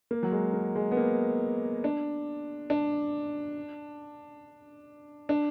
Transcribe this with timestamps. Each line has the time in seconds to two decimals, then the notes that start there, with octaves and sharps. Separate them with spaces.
0.11 A#3
0.23 F#3
0.32 G#3
0.54 A#3
0.75 G#3
0.92 B3
0.97 A#3
1.84 D4
2.70 D4
5.29 D4